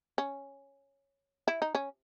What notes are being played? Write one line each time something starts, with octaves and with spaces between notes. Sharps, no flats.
C#4
E4
D#4
C#4